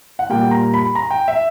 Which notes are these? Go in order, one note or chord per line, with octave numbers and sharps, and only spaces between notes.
F#5
A#2 G3 A#3 G5
A#5
B5
A#5
G5
E5